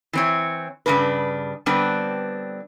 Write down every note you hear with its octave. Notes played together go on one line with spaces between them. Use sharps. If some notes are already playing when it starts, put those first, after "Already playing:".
E3 C4 C#5
G2 A#2 C#3 D4 B4
D3 G3 B3 C4 D4 B4